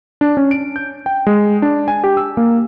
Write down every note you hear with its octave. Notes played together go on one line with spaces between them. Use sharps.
D4
C#4
D7
G6
G5
G#3
D4
G#5
G4
E6
A#3